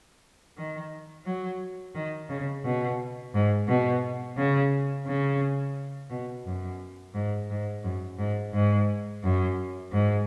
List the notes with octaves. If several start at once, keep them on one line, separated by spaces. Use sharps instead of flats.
D#3
F#3
D#3
C#3
B2
G#2
B2
C#3
C#3
B2
F#2
G#2
G#2
F#2
G#2
G#2
F#2
G#2